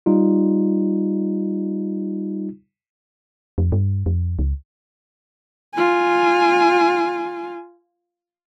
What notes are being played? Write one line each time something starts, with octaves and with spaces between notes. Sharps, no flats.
G3 D#4 F4
F2
G2
F2
C#2
F4 G#5